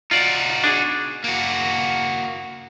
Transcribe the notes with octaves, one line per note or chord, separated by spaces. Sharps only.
D#4 F4 F#4 D5
D4 G#4
A#3 F#4